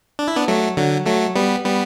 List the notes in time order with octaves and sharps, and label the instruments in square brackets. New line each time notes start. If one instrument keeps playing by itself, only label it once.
[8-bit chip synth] D4
E4
B3 D4
F#3 A3
D3 F#3
F#3 A3
G3 B3
G3 B3